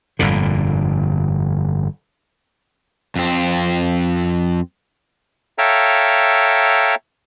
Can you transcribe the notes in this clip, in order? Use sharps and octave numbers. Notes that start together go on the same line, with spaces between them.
G1 F2 A#2 D3
F2 C4
A4 C#5 E5 F5 G5 A#5